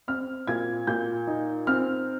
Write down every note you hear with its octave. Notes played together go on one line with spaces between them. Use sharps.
C4 F6
A#2 G#6
A#2 G6
D#4
C4 F6